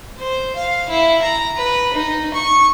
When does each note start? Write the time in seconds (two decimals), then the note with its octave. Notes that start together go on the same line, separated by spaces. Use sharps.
0.18 C5
0.56 F5
0.89 E4
1.22 A#5
1.56 B4
1.93 D#4
2.34 C#6